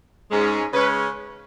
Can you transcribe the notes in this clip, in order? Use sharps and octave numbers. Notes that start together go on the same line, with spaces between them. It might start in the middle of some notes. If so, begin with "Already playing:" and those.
G#2 G#3 C#4
C#3 G#3 C#4 B4